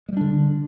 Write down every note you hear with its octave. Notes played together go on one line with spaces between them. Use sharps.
D3 G3 G#3 D4